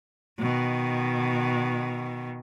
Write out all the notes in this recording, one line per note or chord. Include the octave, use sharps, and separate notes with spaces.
B2 D#3